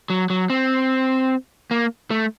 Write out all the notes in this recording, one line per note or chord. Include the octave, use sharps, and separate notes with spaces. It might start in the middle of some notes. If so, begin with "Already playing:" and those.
F#3
F#3
C4
A#3
A3